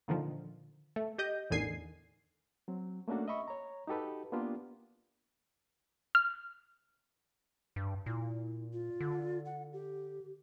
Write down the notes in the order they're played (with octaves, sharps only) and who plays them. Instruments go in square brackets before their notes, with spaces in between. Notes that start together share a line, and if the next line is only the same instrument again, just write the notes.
[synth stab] A#2 D3 D#3 F3
A3
G4 D#5 G6
A1 E2 D3 D#3 G#5 C7
[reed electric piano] F#3 C4
A3 A#3 C#4 D4 F#4 A4
D#5 E5 B5 C#6
C#5 A#5
D#4 F#4 G4 A4 B4
A#3 B3 D4 F4 G4
[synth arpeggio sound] F6
[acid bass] G2
[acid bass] A#2 [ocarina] E4
[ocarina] F4
[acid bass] D3
[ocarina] F#5
G4